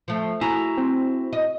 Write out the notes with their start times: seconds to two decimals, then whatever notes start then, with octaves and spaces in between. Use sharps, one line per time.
0.08 F3 A3
0.41 E4 F#4 G#4 A#5
0.77 C4
1.33 D#5